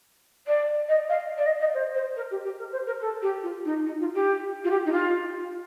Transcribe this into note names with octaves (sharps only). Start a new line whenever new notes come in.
D5
D#5
F5
D5
D#5
D#5
C5
C5
A#4
G4
G4
A#4
C5
A#4
A4
G4
F4
D#4
D#4
F4
G4
F4
G4
D#4
F4